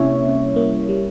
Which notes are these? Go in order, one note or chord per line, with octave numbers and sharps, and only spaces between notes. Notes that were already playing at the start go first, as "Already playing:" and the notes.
Already playing: C3 G3 A#3 C#4 E4 C#5 E5
C3
A#3
G3